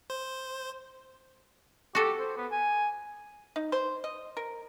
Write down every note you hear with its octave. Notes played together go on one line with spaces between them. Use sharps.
C5
F#4 G4 A4
C5
B3
G#5
D#4
C5
D#5
A#4